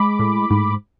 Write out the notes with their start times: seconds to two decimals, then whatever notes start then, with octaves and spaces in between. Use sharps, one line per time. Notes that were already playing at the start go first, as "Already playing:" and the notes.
Already playing: G#3 B5 D6
0.19 A2
0.50 G#2